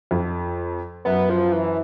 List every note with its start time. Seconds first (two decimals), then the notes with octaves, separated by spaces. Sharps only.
0.11 F2
1.05 F#2 B3
1.30 F3
1.52 E3